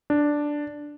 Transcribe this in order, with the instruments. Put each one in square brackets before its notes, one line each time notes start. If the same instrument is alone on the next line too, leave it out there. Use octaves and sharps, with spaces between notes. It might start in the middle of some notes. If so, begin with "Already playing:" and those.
[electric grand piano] D4